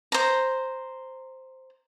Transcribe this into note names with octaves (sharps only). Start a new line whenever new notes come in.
C5 A#5